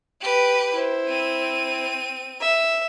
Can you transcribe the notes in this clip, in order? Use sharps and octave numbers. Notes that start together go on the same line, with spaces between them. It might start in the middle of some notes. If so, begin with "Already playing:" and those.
G4 B4
E4 C5
C4 D#7
E5